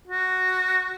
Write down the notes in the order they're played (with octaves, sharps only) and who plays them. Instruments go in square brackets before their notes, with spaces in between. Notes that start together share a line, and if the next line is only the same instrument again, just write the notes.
[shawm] F#4